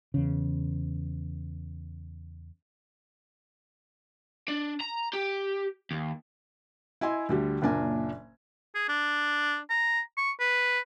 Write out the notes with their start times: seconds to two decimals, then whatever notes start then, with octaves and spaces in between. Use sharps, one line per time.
0.14 E2 C#3
4.48 D4
4.80 A#5
5.14 G4
5.91 D#2
7.01 E4 D#5 G#5 C6
7.29 D2 D3 G3
7.62 F#1 A#2 D4 A#4 G#5
8.75 G#4
8.89 D4
9.70 A#5
10.17 C#6
10.40 B4